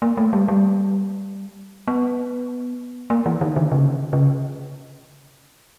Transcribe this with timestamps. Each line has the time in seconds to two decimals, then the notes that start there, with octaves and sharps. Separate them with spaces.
0.02 A#3
0.17 A3
0.33 G3
0.48 G3
1.88 B3
3.10 A#3
3.26 E3
3.41 D#3
3.56 D3
3.72 C#3
4.13 C#3